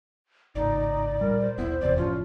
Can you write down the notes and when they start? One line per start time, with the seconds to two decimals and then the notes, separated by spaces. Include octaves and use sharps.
0.55 G#1 C#2 A2 D#4 D5
1.21 A#2 G3 A#4
1.41 C5
1.58 D#1 B1 B3 E4
1.81 F1 E2 C3 D5
1.97 F#1 A2 F3 C#4 F4